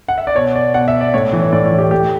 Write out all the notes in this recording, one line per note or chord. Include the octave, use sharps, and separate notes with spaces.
F#5
E5
D5
B2 C#5
D5
B2 F#5
E5
D5
A2 C#5
E3
C#5
A2 D5
C#5
E3
G4
A2 G4